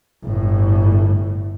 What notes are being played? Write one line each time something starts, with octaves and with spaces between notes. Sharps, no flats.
G1 A2